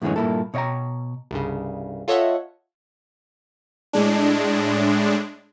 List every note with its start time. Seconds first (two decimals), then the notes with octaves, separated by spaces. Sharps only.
0.02 F#2 A2 D3 E3 G#3 C#4
0.16 G2 A#2 A#3 E4 A4
0.54 B2 C#5 D#5 G5 A#5
1.31 C2 G2 C#3
2.08 F4 A4 C#5 D#5 E5 F#5
3.93 A2 G#3 D4